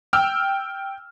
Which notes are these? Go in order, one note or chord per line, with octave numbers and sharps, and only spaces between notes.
G5 E6 F6